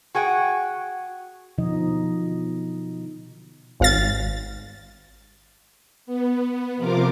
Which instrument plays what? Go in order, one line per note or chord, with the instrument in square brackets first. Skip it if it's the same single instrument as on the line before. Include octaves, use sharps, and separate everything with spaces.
[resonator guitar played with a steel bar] F#4 G#4 F#5 G5
[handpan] B2 D3 F3 D#4 D#5
[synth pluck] G#1 F5 A6
[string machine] B3
C3 F3 F4 A#4 D6